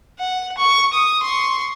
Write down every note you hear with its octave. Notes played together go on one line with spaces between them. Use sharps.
F#5
C#6
D#6
C6 C#6